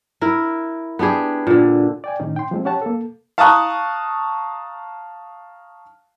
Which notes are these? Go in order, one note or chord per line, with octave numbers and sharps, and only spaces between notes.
E4 A#4
B3 D4 G4 G#4
A#2 D3
D5 G5 G#5
A2 D#3 C#4 D#4
G5 C6
F3 G#3 C4
C#4 G4 C#5 F#5 A5
A#3 A4
F5 A5 A#5 C#6 D#6 F#6